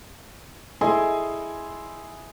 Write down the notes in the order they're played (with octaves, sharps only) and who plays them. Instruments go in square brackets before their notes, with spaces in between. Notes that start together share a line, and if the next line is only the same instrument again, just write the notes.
[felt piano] E4 G#4 A4 D#5 G#5 C6